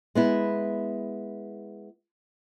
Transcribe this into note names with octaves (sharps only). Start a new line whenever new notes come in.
G#3 B3 E4